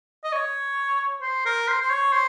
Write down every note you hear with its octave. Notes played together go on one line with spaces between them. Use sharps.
D#5
C#5
C5
A#4
C5
C5
C#5
C5